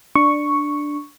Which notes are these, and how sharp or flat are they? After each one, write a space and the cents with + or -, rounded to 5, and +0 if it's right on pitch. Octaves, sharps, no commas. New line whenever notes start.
D4 +5 C#6 +0